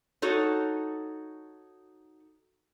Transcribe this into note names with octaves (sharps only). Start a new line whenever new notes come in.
D#4 F#4 A4 C#5